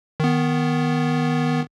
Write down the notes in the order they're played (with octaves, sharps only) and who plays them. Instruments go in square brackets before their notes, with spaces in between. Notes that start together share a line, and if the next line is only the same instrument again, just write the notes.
[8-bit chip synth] D#3 B3